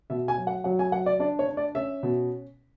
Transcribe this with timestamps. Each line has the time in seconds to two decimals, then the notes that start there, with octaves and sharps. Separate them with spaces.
0.10 B2 E5
0.28 G#5
0.38 F#3
0.47 F#5
0.64 F#3 F#5
0.79 G#5
0.92 F#3 F#5
1.06 D5
1.20 D4 D5
1.39 C#5
1.48 D4
1.57 D5
1.75 C#4 E5
2.03 B2